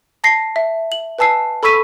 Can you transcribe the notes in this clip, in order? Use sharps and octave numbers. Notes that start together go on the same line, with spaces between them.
A5 A#6 C7
E5
F#7
B4 G#5 A5 E6 C7
A4 B5 C#6 E6 B6 D#7